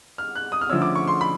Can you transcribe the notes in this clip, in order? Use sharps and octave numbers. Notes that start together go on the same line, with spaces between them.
F6
F#6
D#6
F6
D3 F3 A3 C#4 E6
D6
C#6
C6
B5